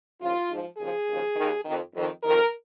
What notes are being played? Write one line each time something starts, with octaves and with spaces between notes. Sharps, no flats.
D#2 C#3 F3 F4
G#2 F3
D#2 C#3 F3 G#4
D#2 C#3 F3
D#2 D#3
F2 D#3
F2 D#3
F2 D#3 A#4